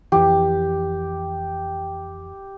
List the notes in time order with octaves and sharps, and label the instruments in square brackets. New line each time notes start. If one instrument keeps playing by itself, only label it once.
[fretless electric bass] F2 E3 [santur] G4